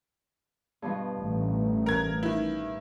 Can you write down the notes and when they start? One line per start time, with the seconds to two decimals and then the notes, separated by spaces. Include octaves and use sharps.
0.82 G2 B2 F3
1.19 A1
1.86 A#4 G#6
2.23 D#3 E4